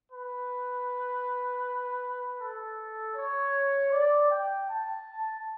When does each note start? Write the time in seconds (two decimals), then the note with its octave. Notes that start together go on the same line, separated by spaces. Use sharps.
0.11 B4
2.39 A4
3.16 C#5
3.92 D5
4.30 G5
4.69 A5